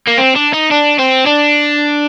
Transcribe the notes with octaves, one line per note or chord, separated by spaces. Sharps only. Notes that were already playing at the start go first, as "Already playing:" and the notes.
A#3
C4
D4
D#4
D4
C4
D4